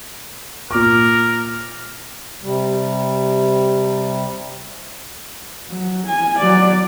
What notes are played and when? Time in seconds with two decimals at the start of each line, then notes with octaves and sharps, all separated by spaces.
0.71 A#2 A#4 D6
2.42 C3 G3
5.68 F#3
6.07 G#5
6.39 F#3 D5